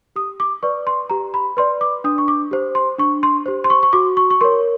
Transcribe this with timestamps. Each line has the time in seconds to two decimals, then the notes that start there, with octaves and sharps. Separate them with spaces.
0.16 G4 D#6
0.40 D6
0.63 B4 D5 C#6
0.87 C6
1.10 G4 A#5
1.34 B5
1.57 B4 D5 C6
1.81 D6
2.04 D4 D#6
2.18 C#6
2.28 D6
2.51 G4 C5
2.75 C6
2.98 D4 C#6
3.23 C6
3.46 G4 C5
3.64 C6
3.70 C#6
3.83 C#6
3.93 F#4 D6
4.17 C#6
4.30 C#6
4.41 A#4 C#5 C6